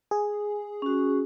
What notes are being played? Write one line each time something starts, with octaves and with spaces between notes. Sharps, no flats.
G#4
C#4 F#4